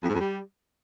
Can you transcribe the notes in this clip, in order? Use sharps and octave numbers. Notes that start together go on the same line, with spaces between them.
F2
G#2
F2
G3